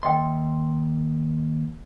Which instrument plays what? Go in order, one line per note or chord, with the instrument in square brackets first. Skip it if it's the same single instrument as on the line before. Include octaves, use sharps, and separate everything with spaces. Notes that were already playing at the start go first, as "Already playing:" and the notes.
[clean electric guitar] D#2 C6 [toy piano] D#5 E5 G5